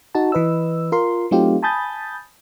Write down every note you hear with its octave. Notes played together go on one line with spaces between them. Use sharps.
D#4 F#4 A5
E3 B4 D#5 E6
F4 A#4 C6
F#3 A3 C4 D#4 F4 G4
G#5 A5 B5 D#6 G6 A6